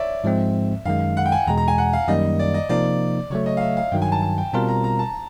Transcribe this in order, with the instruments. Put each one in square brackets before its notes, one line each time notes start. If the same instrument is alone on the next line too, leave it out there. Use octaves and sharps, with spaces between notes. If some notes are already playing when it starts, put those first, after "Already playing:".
Already playing: [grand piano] C#5 D5 E5
[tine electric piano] G#2 F3 G#3 C4
[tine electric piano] F#2 D#3 G#3 [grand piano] F5
[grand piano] F#5
G5
G#5
[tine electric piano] E2 B2 G#3 [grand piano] A#5
[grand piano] A#5
G#5
F#5
F5
[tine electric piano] F#2 D#3 G3 A#3 [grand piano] D#5
[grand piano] D5
D#5
[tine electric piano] C3 F3 A#3 D#4 [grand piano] D5
[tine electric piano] C#3 F#3 A3 [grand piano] C#5
[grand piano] D#5
F5
E5
F5
[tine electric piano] G2 D#3 F#3 [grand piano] G5
[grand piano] G#5
A5
A5
G5
[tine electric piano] B2 G3 C4 F4 A#4 [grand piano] A5
[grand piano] A#5
A#5
A5